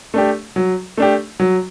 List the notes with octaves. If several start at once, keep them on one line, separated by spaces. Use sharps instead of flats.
A3 D4 G4
F#3
A3 D4 G4
F#3